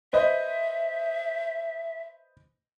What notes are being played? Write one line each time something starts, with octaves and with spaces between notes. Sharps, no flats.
B4 C5 D#5 E5